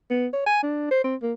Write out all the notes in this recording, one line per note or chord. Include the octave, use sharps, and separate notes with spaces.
B3
C#5
G#5
D4
C5
C4
A#3